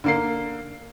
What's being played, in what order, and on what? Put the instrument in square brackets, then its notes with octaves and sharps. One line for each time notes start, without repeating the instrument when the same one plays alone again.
[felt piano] D3 A#3 C7